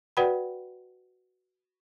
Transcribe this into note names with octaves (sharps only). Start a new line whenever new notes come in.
F#4 B4 D5 F#5 G5 B5